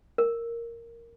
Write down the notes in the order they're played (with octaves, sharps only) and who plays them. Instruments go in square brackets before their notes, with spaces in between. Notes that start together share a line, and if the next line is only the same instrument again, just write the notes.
[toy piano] A#4